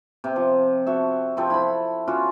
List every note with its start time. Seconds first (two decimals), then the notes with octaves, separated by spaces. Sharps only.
0.24 C3
0.36 F3
0.87 F#4 A4 E5
1.37 C3 F3 C4 A4
1.50 E4 B5
2.07 C#4 F4 F#4 D6